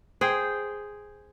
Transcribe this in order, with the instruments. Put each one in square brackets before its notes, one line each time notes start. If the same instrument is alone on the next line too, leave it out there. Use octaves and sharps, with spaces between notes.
[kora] G#4 C5 G5